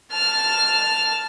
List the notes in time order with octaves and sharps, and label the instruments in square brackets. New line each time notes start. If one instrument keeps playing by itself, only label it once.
[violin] A5 F6